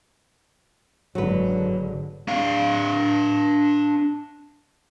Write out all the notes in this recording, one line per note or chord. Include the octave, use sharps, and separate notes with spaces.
F#1 G#2 D3 F#3 B4
D4 F5